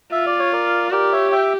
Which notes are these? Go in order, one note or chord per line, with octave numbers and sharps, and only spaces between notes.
F4 E5
D5
C#5
A#4 D5
G4 A#4 D5
C#5 E5
E5 G5